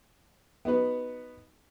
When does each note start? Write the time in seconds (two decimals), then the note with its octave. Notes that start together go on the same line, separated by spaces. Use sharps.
0.65 B3 D#4 F#4 B4